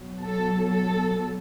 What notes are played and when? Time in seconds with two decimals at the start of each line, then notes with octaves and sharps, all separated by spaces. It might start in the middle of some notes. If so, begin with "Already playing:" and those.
Already playing: B2 F#3
0.23 A4
0.71 A4